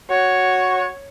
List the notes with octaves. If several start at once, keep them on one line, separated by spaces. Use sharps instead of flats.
F#4 C#5